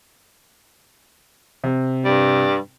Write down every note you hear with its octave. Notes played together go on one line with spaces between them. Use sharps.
C3
G2 G3